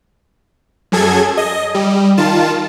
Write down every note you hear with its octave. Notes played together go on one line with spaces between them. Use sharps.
F#2 F#3 G#4 A4 G#6
D#5
G3
D#3 F4 A5